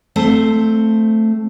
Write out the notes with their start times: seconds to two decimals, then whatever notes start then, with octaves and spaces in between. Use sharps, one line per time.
0.16 A3 C4 C5